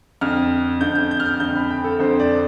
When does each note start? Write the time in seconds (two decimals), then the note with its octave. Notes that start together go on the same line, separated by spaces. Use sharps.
0.21 F2 D3 F6
0.81 F2 D3 G6
0.95 G6
1.11 G6
1.20 F6
1.26 G6
1.40 F2 D3 G6
1.55 B5
1.71 G5
1.84 A4
1.99 F2 D3 C5
2.20 D5